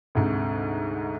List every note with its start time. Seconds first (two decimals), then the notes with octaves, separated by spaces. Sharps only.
0.15 D2 G#2 C3